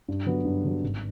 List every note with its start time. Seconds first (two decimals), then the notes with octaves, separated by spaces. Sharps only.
0.08 G2
0.26 D3 F#3 B3
0.45 G2
0.64 D3 F#3 B3
0.83 G#1